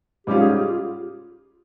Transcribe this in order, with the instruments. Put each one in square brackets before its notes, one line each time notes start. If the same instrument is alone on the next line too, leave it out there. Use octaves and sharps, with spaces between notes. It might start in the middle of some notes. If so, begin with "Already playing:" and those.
[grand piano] G#2 G3 C#4 F4 [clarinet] G4
[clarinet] G#4
G4
F4